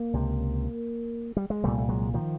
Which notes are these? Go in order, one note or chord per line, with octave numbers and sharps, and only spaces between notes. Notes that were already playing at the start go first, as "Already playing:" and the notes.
Already playing: A#3
C#2 C3
G3
G#3
C2 A#2 G3 A3
A3
F#3 G#3
D#3 F3